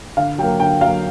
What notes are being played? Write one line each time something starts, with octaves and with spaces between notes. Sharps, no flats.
D3 F5
F#3 A#3 G5
D3 G5
F#3 A#3 F5